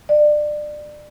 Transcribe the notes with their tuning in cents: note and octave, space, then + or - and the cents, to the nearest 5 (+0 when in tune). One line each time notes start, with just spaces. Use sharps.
D5 +25